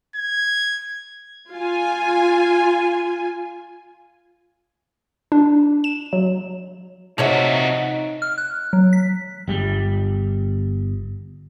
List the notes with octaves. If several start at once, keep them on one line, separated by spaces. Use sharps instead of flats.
G#6
F4 G#5
D4
E7
F#3
C3 F3 D#4 F#4 C#5 E5
F6
F#6
F#3
B6
G1 G3